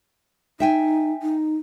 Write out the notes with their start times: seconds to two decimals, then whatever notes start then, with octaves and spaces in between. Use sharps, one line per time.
0.60 D#4 E5 G5 G#5
1.22 D#4